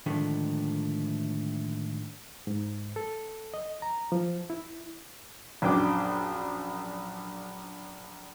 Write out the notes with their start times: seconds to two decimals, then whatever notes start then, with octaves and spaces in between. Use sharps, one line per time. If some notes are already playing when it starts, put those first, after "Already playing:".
0.06 A2 D3 D#3 F3 G#3 A3
2.47 G#2
2.96 A4
3.54 D#5
3.82 A#5
4.12 F3
4.50 E4
5.62 A#1 F#2 D4 G5 D6